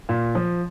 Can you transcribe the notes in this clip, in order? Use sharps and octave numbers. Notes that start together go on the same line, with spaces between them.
A#2
F3